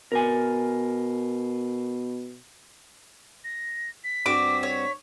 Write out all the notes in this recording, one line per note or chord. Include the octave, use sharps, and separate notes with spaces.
B2 A#4 G#5
A#6
B6
G2 C4 F#4 D6
C#5